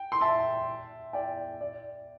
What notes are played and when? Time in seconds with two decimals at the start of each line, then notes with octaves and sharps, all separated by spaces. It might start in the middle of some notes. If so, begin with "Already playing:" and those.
Already playing: G5
0.12 C6
0.21 E5 A5
1.13 D5 G5
1.61 D5